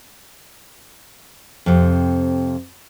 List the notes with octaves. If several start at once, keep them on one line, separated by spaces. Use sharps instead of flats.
F2 C3